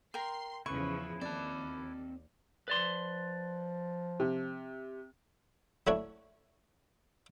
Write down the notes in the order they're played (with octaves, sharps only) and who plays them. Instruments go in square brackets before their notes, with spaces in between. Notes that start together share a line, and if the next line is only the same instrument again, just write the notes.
[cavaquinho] A#4 G5 A#5 [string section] C6 C7
[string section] E2 C#3 F3 [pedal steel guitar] E4 B4 [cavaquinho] C#6
[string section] D#2 [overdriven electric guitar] C4 A5 [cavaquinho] D5
[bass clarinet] F3 [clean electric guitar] B4 D5 C6
[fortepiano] C3
[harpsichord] F#3 A3 D4 E4 C#5